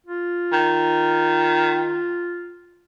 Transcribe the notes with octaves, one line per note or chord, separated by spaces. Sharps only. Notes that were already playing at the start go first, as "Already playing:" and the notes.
F4
D#3